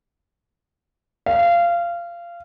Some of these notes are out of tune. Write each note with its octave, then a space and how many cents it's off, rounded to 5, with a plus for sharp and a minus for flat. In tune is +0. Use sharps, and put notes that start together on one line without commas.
F5 -20